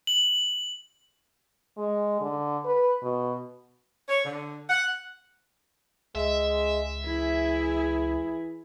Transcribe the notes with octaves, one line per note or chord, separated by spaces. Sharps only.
F#7
G#3
D3
B4
B2
C#5
D3
F#5
C#2 G#3 E5
E3 E4 G#4